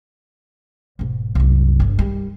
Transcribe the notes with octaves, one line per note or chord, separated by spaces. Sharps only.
E1 G#2
C2 F#2
G1 D4
D#3 G3